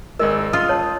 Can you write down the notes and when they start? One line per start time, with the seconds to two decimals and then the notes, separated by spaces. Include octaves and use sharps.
0.19 G#1 G#3 A#4 D#5 E6
0.53 F4 D#6
0.69 C#5 A5